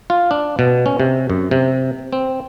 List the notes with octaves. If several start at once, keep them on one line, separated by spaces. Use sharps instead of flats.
F4
D4
B2
C#4
C3
F#2
C3
C4